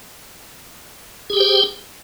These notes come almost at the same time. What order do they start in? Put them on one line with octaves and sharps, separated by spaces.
G#4 G4 G5 C5